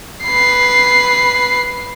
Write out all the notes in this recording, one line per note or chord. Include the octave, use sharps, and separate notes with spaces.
B4 C7